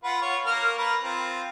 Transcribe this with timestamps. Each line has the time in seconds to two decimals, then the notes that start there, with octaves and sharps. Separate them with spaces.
0.04 F4 B4 F#5
0.22 F4 C#5
0.46 A#3 A#4 F6
0.78 A#4 B4
1.02 C4 F4